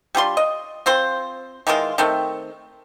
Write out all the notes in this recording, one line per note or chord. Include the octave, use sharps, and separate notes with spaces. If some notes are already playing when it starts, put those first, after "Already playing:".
G3 D4 F4 C6
D#5
C4 F4 C5
D#3 E3 G#3 F4
D#3 A3 C4